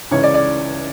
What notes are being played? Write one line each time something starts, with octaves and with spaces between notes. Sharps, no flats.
C#2 C#3 E3 C#5
D5
D5